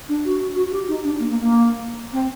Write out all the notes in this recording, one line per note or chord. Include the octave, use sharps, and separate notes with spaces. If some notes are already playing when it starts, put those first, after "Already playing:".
D4
F#4
F#4
G4
D#4
D4
A#3
A#3
A#3
C4